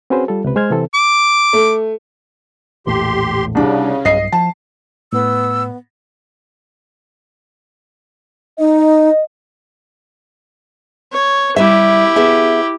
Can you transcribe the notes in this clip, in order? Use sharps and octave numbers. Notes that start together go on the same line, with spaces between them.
C4 C#4 F#4 G#4 B4 C5
G3 F4 A4
C#2 C3 B4
G#3 C5 F6 G#6
C3 E3 C4 A4
D6
A3
A#1 E2 A2 G4 C6
C2 C#3 D4
B1 G2 D#5 C7
F3 A5
A2 B3 E6
D#4 D#5
C#5
G3 E4 G4 E5
B3 G#4 E5